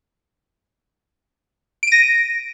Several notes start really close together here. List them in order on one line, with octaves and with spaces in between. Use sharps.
D7 D#7 A#6